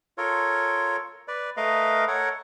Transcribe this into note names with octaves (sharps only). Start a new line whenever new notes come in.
F4 A4 A#4 C#5
B4 D5
A3 A#4 B4 D#5 F5
A4 A#4 C#5 F#5